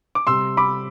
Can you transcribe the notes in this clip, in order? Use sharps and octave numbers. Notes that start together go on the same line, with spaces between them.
D6
C3 G3 C6 E6
B5 D6